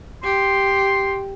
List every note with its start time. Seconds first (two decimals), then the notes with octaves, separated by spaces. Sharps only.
0.23 G4 C6